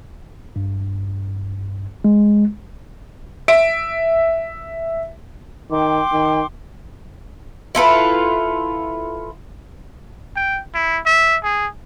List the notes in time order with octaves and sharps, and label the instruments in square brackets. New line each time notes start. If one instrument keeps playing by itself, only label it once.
[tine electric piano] G2
G#3
[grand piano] E5 D7
[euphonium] D#3 [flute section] G5 C6 D6
[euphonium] D#3
[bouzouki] E4 F4 A4 B4
[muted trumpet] G5
E4
E5
G#4